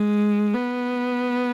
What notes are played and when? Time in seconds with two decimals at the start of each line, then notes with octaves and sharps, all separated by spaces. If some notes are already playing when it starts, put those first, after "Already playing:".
Already playing: G#3
0.53 B3